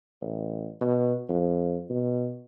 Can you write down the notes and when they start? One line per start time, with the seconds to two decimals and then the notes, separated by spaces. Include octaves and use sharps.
0.22 A1
0.81 B2
1.29 F2
1.90 B2